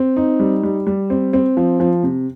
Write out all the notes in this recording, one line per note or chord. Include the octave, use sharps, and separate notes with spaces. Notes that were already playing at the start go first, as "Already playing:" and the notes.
Already playing: C4
D#4
G3
G3
G3
C4
C4
F3
F3
C3